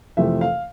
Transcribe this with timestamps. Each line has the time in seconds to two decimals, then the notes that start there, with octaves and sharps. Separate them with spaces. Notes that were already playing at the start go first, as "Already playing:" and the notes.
0.17 F2 C3 E3 A3 C4 E5
0.41 F5